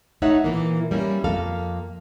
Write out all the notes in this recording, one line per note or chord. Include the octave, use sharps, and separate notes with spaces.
A3 D#4 C#5 E5 F#5
A#2 E3 A#3
G3 A#3 C#4 E4
F2 A#3 A4 F5